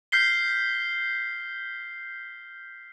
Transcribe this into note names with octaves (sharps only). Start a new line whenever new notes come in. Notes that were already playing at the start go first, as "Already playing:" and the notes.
F6 G6 B6 C7 G7